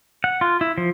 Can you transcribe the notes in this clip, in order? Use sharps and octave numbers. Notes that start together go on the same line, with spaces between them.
F#5
F4
E4
F3